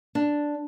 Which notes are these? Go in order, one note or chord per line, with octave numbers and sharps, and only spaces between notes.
D4